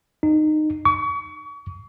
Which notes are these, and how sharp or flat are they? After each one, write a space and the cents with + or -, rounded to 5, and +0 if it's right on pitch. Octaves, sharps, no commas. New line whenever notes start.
D#4 -20
C#6 +35